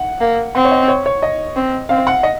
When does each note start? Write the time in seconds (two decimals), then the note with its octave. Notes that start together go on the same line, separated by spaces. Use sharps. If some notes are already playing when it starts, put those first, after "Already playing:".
Already playing: F#5
0.20 A#3
0.55 C4 F#5
0.65 C#5
0.71 D#5
0.88 C#5
1.06 C#5
1.22 D#5
1.56 C4
1.89 C4 F5
2.07 F#5
2.23 D#5